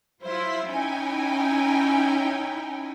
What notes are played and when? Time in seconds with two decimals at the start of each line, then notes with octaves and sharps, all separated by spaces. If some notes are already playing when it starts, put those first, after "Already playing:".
0.23 F#3 E4 F4 C5 E5
0.68 C#4 D#4 E4 G5 G#5